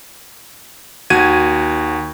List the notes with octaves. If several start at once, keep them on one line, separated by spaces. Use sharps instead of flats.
D#2 F#4 G#6 D#7